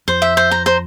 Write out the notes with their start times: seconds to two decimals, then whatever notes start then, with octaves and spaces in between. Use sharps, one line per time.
0.08 F2 C5
0.22 E5
0.37 C5
0.51 A#5
0.66 C5